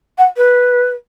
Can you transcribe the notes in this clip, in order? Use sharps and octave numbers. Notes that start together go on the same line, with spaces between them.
F#5
B4